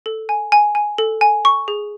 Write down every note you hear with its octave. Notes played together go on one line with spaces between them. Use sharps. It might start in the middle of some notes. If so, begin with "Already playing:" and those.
A4
G#5
G#5
G#5
A4
G#5
C#6
G#4